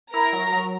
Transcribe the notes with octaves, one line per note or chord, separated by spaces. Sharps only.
E4 A#4 A#5
F#3
F#3